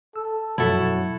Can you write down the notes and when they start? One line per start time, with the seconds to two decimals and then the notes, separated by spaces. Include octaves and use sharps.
0.16 A4 E6
0.58 F#2 B2 F3 F#3 E4 F#4 A4